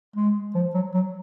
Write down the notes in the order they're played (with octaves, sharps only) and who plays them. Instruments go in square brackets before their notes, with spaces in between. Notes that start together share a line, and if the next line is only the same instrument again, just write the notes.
[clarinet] G#3
F3
F#3
F#3